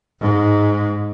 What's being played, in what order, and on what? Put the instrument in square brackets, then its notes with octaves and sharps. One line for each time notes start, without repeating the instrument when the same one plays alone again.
[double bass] G#2